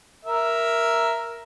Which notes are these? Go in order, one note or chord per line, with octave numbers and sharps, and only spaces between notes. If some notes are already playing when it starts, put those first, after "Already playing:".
A#4 E5